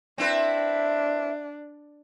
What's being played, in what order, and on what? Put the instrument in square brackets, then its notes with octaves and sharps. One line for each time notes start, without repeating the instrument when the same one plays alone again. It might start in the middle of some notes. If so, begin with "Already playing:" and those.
[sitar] C4 E4 B4 [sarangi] D4